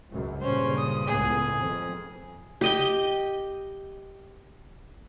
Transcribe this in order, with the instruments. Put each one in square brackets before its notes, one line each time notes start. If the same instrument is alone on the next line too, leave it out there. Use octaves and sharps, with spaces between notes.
[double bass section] C#2 F#2
[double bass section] G2 A#2 C#3 [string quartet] C#4 C5
[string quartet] D#6
[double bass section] C#2 A2 B3 [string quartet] G#4
[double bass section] F2
[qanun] G4 D#5 G5